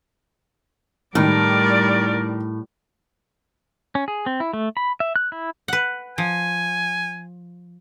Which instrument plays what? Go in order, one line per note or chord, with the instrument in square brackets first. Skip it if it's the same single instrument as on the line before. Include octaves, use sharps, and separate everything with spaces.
[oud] A2 [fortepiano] D#3 [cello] G3 [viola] A#4 D5
[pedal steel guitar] C#4
G#4
C4
E4
A3
B5
E5
F#6
E4
[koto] B4 F#5
[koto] F3 [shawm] G#5